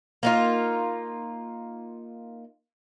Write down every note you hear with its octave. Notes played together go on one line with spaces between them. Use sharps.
A#3 D#4 F4